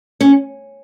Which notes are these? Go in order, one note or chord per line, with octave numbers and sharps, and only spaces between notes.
C#4